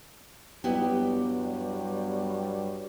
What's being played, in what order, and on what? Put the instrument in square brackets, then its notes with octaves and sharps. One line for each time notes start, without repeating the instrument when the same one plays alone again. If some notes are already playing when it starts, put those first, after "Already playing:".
[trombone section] G2 F#3 G3 [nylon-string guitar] B3 E4 G4